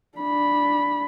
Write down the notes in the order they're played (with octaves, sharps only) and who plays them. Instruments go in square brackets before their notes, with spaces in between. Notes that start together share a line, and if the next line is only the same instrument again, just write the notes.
[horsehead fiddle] D4 B5